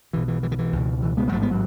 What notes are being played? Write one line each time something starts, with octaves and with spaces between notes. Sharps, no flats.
B1 B2 E3
E3
E3
D#3
E3
C#2 B2
E3
G#3 B3
G#3
A1 G#2 F#3 A3
G#3 B3
F#3